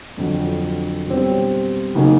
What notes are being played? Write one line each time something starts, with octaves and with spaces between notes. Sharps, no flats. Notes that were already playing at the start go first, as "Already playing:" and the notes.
F2 D3 F#3
B2 G3 C4
C#3 F#3 A#3 D#4